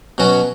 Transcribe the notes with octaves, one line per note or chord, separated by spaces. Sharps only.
B2 F#3 C#4 F#4